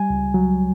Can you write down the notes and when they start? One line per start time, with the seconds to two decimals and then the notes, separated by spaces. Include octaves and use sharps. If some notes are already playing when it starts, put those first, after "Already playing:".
Already playing: G3 G#5
0.10 C#2
0.34 F#3